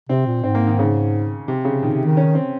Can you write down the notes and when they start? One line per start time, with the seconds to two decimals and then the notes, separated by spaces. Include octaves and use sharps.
0.09 C3 C4
0.26 A#2
0.43 G#2 C4
0.55 A#3
0.67 D#3
0.79 C#3
1.48 C3
1.65 C#3
1.82 A#2 D#3
1.94 C3
2.05 D#3
2.17 C#4
2.35 C4